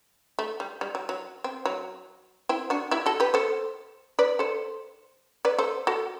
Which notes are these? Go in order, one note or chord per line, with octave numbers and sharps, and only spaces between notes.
A3
G3
G3
F#3
F#3
C4
F#3
C4 E4
D4 F#4
E4 G4
F#4 A4
G4 B4
A4 C5
B4 D5
A4 C5
B4 D5
A4 C5
F#4 A4